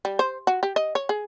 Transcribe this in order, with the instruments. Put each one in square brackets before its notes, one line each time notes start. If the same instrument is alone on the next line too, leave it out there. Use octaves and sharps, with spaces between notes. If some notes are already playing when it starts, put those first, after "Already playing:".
[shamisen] G3
C5
F#4
G4
D#5
C#5
G#4